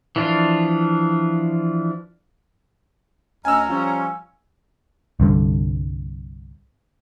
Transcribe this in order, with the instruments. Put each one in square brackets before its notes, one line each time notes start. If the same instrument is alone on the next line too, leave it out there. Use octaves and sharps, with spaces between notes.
[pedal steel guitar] E3 F3 D4 F4
[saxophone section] D2 C#4 [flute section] D#5 F6 [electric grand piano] G#5 E6 [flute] A#5
[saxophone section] F3 G3 F4 [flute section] C#4
[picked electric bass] C2 G2 D3